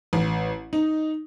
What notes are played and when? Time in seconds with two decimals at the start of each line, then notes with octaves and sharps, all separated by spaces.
0.13 A1
0.73 D#4